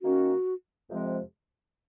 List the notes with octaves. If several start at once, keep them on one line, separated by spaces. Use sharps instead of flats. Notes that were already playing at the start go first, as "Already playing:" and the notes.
D#3 A#3 C#4 F#4
F2 C3 F3 G#3 C4